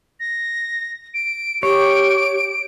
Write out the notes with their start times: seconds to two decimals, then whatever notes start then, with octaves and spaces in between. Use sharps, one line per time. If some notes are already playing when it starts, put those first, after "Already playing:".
0.20 A#6
1.14 D7
1.63 G4 C#5 D7